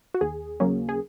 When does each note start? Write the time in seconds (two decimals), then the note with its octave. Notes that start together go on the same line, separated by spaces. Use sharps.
0.14 F#4
0.21 D#2 G#4
0.60 C#3 F#3 A#3 C#4
0.89 G#4